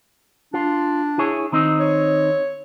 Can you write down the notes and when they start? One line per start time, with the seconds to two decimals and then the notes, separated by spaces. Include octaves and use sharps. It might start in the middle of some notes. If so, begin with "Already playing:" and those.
0.54 D4 F4
1.18 E4 G#4 C#5
1.52 D#3 C4 D#4
1.80 C#5